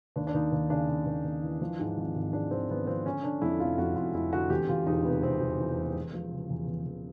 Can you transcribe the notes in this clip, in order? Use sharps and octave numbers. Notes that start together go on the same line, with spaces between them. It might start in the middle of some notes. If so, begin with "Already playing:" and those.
D#2 D4
D4
D#2 D#4
D#2
C#3 D4
C#3
D#2
D#2
E3
F3
G#2
G#1
G#1
G#2 D4
G#1 C4
G#1 B3
F3 C4
D3 C#4
D3 D4
F2 E4
F1 F4
F1 F#4
F1 F4
F1 E4
D3 F#4
E2 G4
E2 F4
E1 D#4
C3 B3
C3 C4
E1
E3
E1
E2
F3
C#3
E2
E2
E2